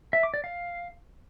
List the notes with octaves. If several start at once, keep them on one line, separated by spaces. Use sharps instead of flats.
E5
D6
D5
F5